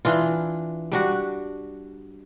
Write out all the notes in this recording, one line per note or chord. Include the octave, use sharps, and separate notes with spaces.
E3 D4 F4
G3 D4 F#4